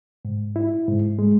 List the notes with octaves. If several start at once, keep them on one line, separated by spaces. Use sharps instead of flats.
G#2
E4
G#2
G#3